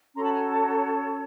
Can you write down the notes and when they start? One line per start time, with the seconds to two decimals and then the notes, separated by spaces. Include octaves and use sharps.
0.15 C#4 F#4 A4 C#5 A#5 C6
0.23 A5 B5
0.32 G#5 A#5
0.49 A5
0.62 A#5